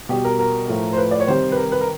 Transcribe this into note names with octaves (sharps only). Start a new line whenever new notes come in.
B2 G3 G4
A#4
A#4
A2 F3 A3
C5
B4
D5
C#5
C3 D#3 G3 C5
B4
A#4
B4
A#4